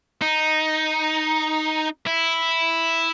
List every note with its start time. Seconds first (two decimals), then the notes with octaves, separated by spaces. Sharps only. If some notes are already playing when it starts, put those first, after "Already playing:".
0.22 D#4
2.07 E4